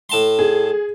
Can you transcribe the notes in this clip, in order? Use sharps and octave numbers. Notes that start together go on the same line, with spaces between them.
A2 A5 C6
G#4